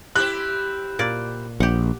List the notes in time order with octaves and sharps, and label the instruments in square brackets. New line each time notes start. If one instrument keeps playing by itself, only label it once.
[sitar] C4 E4 G4 [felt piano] F#6
[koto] A#2 D5
[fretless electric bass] A#1 [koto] G4 F#5